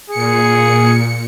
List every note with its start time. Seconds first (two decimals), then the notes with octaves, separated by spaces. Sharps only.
0.10 A#2 G#4 C#7